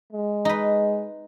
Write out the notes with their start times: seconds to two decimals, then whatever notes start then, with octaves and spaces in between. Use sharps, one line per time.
0.12 G#3
0.45 D#4 B4